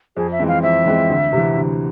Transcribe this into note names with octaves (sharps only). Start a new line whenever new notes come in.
F2 G#4
E5
E3 G#3 C4
F5
F2 E5
E3 G#3 C4
D2
C3 E3
D2